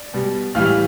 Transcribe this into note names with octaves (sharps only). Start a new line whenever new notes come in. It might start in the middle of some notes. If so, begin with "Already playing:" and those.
Already playing: D5
B2 G3
A2 E3 G3 F5 F6